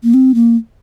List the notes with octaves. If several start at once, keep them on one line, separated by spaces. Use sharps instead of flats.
A#3
C4
A#3